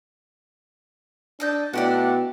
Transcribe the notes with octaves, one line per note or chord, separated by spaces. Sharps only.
D4 A4 D#5 G6
B2 A3 D4 E4 F#4 G4 D5 F#5